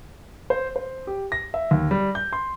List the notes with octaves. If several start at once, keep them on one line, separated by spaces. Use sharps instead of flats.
C5
C5
G4
A#6
E5
D#2
G3
G6
C6